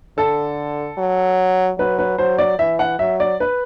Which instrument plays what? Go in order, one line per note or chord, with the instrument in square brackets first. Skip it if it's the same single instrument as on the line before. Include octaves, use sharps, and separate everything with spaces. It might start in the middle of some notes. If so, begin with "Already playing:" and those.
[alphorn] D3 [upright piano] A4
[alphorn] F#3
[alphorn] F#3 [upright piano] B4
[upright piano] B4
[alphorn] F#3 [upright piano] C5
[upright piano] D5
[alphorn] E3 [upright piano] E5
[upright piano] F#5
[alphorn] F#3 [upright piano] E5
[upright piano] D5
B4